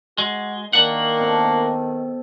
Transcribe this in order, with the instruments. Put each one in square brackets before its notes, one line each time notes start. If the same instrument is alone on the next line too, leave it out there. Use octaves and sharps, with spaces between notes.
[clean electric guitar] G#3 [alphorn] F#4
[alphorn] D#3 [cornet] A#3 [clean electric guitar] D4 F#5
[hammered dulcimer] B2 C4 A4